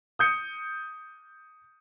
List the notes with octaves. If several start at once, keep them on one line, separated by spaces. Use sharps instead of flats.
D#6 G6 C#7